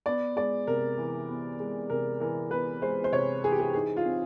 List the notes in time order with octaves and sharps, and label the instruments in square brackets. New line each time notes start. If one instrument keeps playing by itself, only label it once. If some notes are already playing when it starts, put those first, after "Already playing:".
[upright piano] B3 D5
G#3 D5
C3 A#4
E3
B3
G#3
C3 A#4
E3 A#4
B3 B4
G#3 C5
C5
C3 C#5
E3 G#4
G4
G#4
D#4 G#4
F4
C4